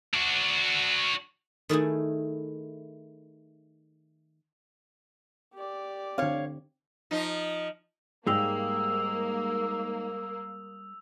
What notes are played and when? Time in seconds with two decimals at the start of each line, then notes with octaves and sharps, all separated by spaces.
0.14 D4 F#4
1.69 D#3 A3 E4 G#4
5.54 G4 D5
6.18 D3 C4 C#5 F5
7.11 F3 D#4
8.27 G#2 G3 G#3 A#3 G4 D#6 E6 F7